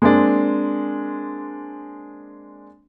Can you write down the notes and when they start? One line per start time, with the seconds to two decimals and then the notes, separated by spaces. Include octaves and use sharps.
0.02 G#3 A#3 C4 D4